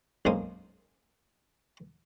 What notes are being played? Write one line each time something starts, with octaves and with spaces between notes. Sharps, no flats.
B1 F#2 G#3 A#3 C5 D#6